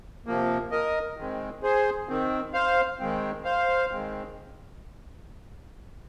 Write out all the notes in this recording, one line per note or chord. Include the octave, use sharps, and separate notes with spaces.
C3 F3 A#3
A#4 D#5
D#3 G#3 C4
G#4 C5
D#3 C4
C5 F5
D#3 G#3 C4
C5 F5
D#3 G#3 C4